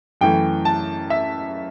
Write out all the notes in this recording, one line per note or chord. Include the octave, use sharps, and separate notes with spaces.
F#2 E3 A3 G5
A5
E5